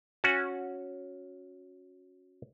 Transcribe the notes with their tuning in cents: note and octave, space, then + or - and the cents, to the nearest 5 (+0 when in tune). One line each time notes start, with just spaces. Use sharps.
C#4 +0 F#4 -15 G#5 -20